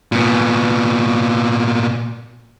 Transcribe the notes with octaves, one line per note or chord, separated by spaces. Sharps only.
A#2 B3